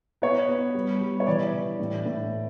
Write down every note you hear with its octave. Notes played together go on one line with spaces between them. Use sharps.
B3 C#5
B3
G3
G3
C#5
E3 D5
E3
A2
A2